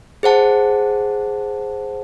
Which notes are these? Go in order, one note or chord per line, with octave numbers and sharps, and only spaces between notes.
G#4 C5 F#5 A5